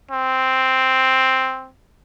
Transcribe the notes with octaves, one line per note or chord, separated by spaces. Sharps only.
C4